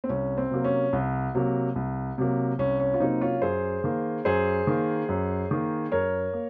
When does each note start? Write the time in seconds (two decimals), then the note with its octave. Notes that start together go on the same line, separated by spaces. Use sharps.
0.04 C4
0.09 C2 C#4
0.37 C4
0.51 C3 F#3 A#3
0.64 C#4
0.93 C2
1.35 C3 F#3 A#3
1.76 C2
2.18 C3 F#3 A#3
2.59 C2 C#4
2.80 C#4
2.94 F4
3.00 C3 F#3 A#3 C4 D#4
3.21 C#4 F4
3.42 F#2 G#4 C5
3.84 D#3 A#3
4.25 F#2 G#4 C5
4.67 D#3 A#3
5.09 F#2
5.51 D#3 A#3
5.92 F#2 A#4 C#5
6.33 A#3